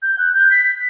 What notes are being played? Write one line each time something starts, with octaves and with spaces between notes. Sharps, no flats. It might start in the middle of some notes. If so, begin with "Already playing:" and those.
G6
F#6
G6
B6